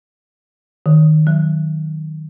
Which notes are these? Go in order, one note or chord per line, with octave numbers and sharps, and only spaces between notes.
D#3
F#3